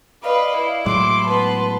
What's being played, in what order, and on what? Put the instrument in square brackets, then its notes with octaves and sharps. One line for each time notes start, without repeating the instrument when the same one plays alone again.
[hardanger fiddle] B4 [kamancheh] D5 D#5 [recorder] F5
[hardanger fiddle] E4
[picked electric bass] A2 F#3 G#3 [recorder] C6 [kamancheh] D6
[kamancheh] B3 A5 [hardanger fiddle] B4